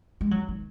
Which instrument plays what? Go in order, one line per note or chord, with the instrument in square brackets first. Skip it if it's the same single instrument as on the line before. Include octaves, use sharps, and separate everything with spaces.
[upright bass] G#3
F#3
D#3